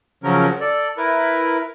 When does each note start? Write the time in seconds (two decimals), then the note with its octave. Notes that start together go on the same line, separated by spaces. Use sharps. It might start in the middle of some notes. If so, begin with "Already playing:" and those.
0.24 C#3 F3 F#3 C#4 A#4
0.61 A4 D5
0.98 E4 A#4 B4